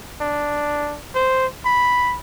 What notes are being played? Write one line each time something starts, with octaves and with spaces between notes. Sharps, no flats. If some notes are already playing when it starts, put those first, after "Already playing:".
D4
C5
B5